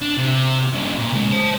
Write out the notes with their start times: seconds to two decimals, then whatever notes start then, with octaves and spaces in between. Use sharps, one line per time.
0.02 D4
0.18 C3
0.73 G2 C#3
0.99 A#2
1.13 C#3 G#3
1.31 C5 A5